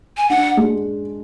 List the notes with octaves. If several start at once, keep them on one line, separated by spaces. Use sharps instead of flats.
G#5
D4 F#5
G#3